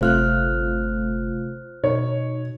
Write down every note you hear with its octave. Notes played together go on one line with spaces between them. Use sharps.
G1 C3 A3 F4 C5 F6 F#6
B2 D#4 C#5